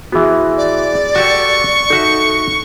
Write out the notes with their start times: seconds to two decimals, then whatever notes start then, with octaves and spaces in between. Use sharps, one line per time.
0.12 E3 B3 F#4 G#4 E5
0.57 D5
1.16 F#4 G4 A4 C#6 C#7
1.90 D#4 F#4 A4 E5